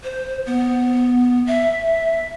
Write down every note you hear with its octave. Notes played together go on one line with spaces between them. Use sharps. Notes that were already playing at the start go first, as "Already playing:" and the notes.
C5
B3
E5